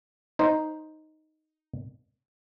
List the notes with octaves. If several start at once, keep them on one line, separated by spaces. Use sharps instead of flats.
D#4 C5